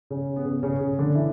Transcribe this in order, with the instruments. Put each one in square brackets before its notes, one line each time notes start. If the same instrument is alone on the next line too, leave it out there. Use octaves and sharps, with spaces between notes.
[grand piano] C#3 C#4
B3
C#3 C#4
C#3 C#4
C#3 C#4
D3 D4
E3 E4